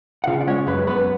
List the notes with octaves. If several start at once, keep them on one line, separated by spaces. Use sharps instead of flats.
F#5
C#3 F4 F5
D5
G#3 C#4 C#5
F#2 B3 B4
F#2 B3 B4